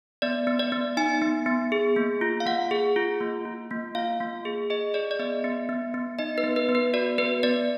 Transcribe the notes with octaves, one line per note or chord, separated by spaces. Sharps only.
B3 D5
B3
D5
B3
D#4 G#5
B3
B3
G#4
A#3
F4
F5
A#3 F#5
G#4
F4
A#3
F4
A#3
F4 F5
A#3
G#4
G#4 D#5
G#4 D5
D5
B3 D#5
B3
B3
B3
D#4 D#5
B4
B3
B4
B3
B4
F#4 D5
B3 B4
B3 D5